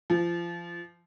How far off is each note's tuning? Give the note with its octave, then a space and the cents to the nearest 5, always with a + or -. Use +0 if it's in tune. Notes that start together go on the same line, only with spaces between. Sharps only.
F3 -25